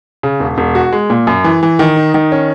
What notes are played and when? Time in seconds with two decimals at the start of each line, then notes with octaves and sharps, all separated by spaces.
0.23 C#3
0.40 E1
0.58 E1
0.75 F#4
0.93 G#3
1.10 A#2
1.27 F#2
1.44 E3
1.63 E3
1.79 D#3
1.96 D#4
2.14 D#3
2.32 C#4